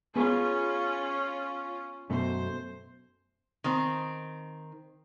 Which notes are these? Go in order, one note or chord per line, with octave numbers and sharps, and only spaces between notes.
B3 C#4 F4 G#4 B4
F#2 B2 A3 C5
D#3 C4